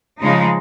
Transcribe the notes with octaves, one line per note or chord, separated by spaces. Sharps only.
C#3 F3 G#3 D#4